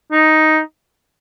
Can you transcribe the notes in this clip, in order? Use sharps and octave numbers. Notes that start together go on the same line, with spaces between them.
D#4